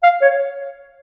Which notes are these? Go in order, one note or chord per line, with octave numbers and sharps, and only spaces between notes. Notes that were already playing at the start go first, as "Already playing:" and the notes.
F5
C#5